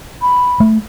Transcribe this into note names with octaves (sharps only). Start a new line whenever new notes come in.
B5
A3